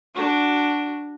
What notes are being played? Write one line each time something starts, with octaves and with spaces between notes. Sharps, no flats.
D4 F#4